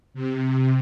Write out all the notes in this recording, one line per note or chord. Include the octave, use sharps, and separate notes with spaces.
C3